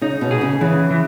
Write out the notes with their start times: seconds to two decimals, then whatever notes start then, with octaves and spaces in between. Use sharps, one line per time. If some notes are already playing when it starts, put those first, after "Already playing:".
0.01 C#3 D#4
0.21 B2
0.31 G#4
0.41 C#3
0.61 C#3 E3
0.91 E3